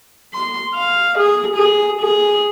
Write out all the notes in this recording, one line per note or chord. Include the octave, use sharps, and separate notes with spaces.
C6
F5
G#4
G#4
G#4